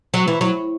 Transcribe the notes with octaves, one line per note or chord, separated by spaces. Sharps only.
F#3
E3
F#3